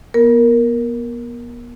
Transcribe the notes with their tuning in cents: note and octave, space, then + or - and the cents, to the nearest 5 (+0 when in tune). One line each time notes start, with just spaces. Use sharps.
B3 -35 A#4 +0